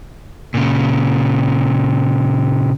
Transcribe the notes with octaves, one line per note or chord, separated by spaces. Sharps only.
A#2 C#3